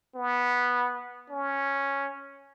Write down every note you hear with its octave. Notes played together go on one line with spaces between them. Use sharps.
B3
C#4